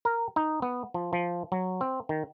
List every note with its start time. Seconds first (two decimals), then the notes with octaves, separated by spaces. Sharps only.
0.05 A#4
0.36 D#4
0.62 B3
0.94 F3
1.13 F3
1.52 F#3
1.81 C4
2.09 D#3